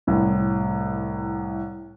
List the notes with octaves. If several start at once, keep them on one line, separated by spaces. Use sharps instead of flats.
C2 A2